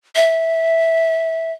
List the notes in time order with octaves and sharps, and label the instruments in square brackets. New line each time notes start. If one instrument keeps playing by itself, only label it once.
[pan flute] E5